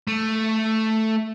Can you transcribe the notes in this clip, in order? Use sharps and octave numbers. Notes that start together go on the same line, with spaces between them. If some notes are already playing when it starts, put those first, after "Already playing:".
A3